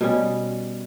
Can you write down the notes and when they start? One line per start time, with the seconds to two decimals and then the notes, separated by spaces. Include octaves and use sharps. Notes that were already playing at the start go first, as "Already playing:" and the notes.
0.01 B2 G3 C#4